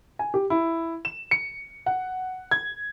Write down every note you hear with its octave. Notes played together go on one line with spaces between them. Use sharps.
G#5
G4
E4
E7
C#7
F#5
G#6